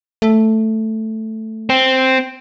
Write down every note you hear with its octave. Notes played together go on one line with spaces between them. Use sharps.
A3
C4